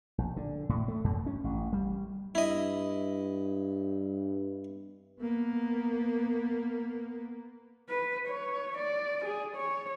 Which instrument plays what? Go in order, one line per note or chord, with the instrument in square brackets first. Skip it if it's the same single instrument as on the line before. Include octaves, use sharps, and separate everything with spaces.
[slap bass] A#1
D3
A2
A3
F#2
C#4
A1
G3
[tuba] G2 [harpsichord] E4 D#5
[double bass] A#3 B3
[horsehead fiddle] B4
C#5
D5
G#4
C#5